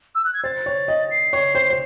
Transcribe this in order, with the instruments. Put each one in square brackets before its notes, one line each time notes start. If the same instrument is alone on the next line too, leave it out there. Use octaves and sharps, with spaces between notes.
[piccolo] E6
F#6
G#6
[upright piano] C5 [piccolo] A6
[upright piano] C#5
D#5
[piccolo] C7
[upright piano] C#5
C5
C5